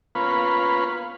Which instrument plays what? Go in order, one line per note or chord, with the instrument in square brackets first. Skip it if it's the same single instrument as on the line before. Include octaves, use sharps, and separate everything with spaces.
[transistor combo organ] A#3 B3 C#4 F4 B4